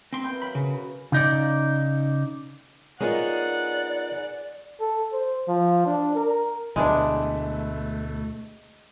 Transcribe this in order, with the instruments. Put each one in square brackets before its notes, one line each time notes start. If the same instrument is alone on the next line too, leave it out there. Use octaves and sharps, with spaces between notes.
[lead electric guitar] C4 C6
[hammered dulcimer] B3 E4 A#4 [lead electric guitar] G5
[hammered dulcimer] F#3 F5 [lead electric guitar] B5
[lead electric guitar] C#3
[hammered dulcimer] B4
[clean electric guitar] C#3 D#4 D5
[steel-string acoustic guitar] B3 D#4 G#4 [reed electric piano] F4 A#4 C#5 [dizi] D5 [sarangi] F#5
[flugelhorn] A4
C5
F3
D4
A#4
[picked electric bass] D2 B2 [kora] G#3 D4 [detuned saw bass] A3 [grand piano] E4 B4